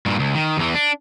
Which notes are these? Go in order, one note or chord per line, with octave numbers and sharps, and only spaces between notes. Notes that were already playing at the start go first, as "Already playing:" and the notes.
G2 A#2
C#2
D#3
E2 E3
D4